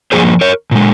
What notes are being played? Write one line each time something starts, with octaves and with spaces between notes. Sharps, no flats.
G2 F3 A#3 G#4 C5
A#4 C#5
A#2 G#3